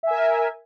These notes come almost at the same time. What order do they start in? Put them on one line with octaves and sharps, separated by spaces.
E5 G#5 A#4